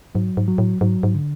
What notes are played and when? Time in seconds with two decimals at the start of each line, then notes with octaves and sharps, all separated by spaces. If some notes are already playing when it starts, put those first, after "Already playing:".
0.15 G#2 F#3
0.37 G#2
0.48 F#3
0.58 A2
0.81 G#2 F#3
1.03 G#2
1.15 D3